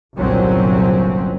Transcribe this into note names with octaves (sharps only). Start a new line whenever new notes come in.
G1 C2 A#2 F#3 C4 C#4